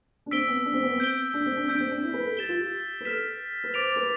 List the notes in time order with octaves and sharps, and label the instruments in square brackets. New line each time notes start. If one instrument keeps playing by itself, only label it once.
[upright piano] D4
[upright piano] C4 [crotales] E6 B6 D7 G7
[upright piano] B3
D4
C4
B3
C4
[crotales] G6 D7 G7
[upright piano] D4
C4
D4
[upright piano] D4 [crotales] E6 G6 B6 D7
[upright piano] C4
D4
E4
B4
A4
[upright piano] G4 [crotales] A6 E7 G7
[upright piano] F4
G4
B4
[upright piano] A4 [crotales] F6 B6 E7
[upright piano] B4
[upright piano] C5 [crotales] D6 A6 D7 F7
[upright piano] C5
B4